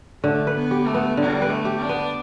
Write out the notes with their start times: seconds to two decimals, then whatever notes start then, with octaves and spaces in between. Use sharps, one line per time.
0.23 D3 A3
0.47 B4
0.55 B3
0.71 G4
0.86 A3
0.94 B3
1.17 D3 G3
1.42 B4
1.49 A3
1.65 G4
1.81 D4
1.89 B3